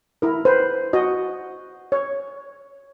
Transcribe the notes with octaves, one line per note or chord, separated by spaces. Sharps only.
E4 A#4
B4 C5
F#4 D#5
C#5